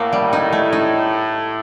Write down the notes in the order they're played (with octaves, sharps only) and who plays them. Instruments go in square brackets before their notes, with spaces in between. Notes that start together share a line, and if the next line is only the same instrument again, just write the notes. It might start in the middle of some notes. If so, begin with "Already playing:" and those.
Already playing: [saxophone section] A2 [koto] A#3 F#4
[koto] G3
D#4
A3
D#4